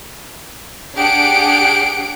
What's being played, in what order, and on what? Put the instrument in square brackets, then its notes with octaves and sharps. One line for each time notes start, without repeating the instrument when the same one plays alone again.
[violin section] D4 G4 G#4 F#5 C7 D7